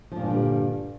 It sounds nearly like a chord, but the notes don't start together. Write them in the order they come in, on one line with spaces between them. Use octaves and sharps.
F3 A#2 G2 D3 G3